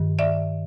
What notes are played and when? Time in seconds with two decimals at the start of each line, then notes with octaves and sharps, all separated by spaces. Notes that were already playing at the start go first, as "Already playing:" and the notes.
Already playing: G2 D#3
0.19 D5 E5